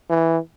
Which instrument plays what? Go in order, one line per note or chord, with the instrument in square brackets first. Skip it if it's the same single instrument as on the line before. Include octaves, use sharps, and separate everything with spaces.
[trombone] E3